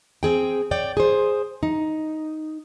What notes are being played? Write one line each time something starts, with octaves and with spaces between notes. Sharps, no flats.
C4 G#4 G5
C#5 D5 G5
G#4 C5
D#4